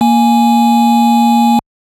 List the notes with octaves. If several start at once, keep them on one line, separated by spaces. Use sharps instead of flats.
A#3 G#5